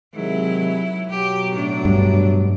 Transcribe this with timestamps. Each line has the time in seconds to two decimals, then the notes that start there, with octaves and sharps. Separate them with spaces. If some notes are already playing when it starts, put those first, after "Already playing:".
0.15 C3 D#3 F#3 G#3 E4
1.10 B2 F#3 G4
1.54 A2 D4
1.85 G2